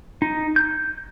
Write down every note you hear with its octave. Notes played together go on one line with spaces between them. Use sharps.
D#4
G6